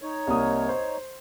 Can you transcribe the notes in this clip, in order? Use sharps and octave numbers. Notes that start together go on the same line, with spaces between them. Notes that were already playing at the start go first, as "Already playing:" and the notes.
D#4 C#5
C2 A#3 D#6
C5